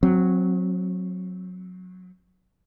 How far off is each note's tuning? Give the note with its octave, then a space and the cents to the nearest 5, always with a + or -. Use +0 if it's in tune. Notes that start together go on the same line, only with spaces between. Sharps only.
F#3 -15 C4 +10